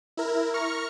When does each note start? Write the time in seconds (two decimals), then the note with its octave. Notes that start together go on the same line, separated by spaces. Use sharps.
0.17 E4 A#4
0.54 C#6 F6 A#6 C#7